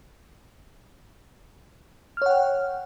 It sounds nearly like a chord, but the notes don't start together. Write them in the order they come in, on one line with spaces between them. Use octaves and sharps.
F6 C#5 F#5 G5